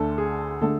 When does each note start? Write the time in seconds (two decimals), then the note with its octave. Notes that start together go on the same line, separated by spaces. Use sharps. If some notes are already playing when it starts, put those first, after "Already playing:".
Already playing: D2 D3 A3 A4
0.18 G#4
0.61 D3 A3 A4